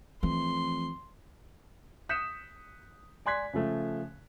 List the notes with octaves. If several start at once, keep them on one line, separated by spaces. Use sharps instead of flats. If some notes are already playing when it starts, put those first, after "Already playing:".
F2 E3 A3 C6
D#6 F#6 G6 B6 C#7 E7
D5 G#5 C6 F#6 G#6 B6
C#3 F3 A3